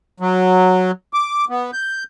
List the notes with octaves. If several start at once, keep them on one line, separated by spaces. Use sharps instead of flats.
F#3
D6
B3
G6